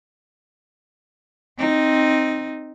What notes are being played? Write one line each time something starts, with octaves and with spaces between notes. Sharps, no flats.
C4 D#4